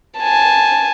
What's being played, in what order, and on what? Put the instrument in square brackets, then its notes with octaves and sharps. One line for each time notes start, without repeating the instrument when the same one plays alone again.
[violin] G#5 A5